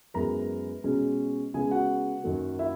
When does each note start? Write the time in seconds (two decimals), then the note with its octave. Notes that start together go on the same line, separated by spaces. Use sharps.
0.14 F#2 E3 G#3 B3 A#4 A#5
0.84 B2 G#3 C#4
1.54 C#3 G#3 B3 G#4 G#5
1.71 F#4 F#5
2.24 F#2 D#3 F#3 A#3
2.59 E4 E5